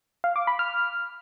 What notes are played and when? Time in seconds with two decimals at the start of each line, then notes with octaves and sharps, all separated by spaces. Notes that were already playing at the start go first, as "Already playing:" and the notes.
0.24 F5
0.36 D6
0.47 B5
0.59 F6